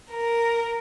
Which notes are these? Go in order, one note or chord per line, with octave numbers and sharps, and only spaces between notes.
A#4